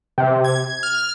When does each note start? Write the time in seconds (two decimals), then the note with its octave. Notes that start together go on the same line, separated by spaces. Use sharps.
0.18 C3
0.44 G#6
0.83 F6